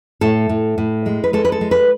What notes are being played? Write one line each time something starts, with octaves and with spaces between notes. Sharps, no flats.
A2 A4
A2
A2
G#3
B4
G#3 A4
B4
A4
G#3
B4